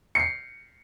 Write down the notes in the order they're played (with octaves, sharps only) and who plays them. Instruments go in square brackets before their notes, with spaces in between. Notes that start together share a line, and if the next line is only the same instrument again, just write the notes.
[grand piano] C7 C#7